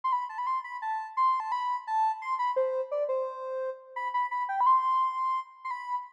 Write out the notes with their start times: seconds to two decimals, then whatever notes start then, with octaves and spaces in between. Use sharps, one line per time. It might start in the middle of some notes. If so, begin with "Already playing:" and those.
0.04 C6
0.12 B5
0.29 A5
0.38 B5
0.47 C6
0.64 B5
0.82 A5
1.17 C6
1.40 A5
1.52 B5
1.87 A5
2.22 C6
2.39 B5
2.56 C5
2.91 D5
3.09 C5
3.96 B5
4.14 B5
4.31 B5
4.49 G5
4.61 B5
4.66 C6
5.65 C6
5.71 B5